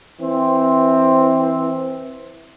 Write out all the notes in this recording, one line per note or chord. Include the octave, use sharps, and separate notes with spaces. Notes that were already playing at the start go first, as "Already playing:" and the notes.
E3 C4